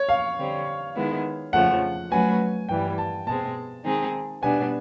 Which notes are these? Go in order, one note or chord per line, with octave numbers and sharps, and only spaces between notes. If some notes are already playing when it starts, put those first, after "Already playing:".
Already playing: C#5
F5
D3 G3 C4
D#3 G#3 B3 E4
F2 C#3 F3 A3 F#5
F#3 A3 C#4 F#4 B4 G#5
G2 E3 G3 G5
A5
B2 G#3 C4 A5
D#3 G#3 C4 D#4 G#4
B2 G3 B3 D4 G#5